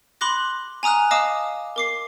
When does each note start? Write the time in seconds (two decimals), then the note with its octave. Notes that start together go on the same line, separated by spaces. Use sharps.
0.21 B5 C6 D6 F#6 A#6
0.83 G#5 A#5 D#6 F6 F#6
1.11 D#5 F5 A5 D6 D#6
1.76 A#4 D6 C7